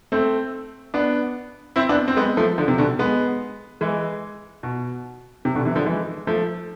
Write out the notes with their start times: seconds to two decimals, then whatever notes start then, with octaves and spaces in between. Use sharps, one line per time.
0.12 A3 C4
0.94 B3 D4
1.76 C4 E4
1.89 B3 D4
2.08 C4
2.17 G#3 B3
2.37 F3 A3
2.58 D3 F3
2.68 C3
2.78 B2 D3
2.99 G#3 B3
3.81 E3 G#3
4.63 B2
5.45 C3
5.55 B2 D3
5.65 C3 E3
5.76 D3 F3
5.86 E3 G#3
6.27 F3 A3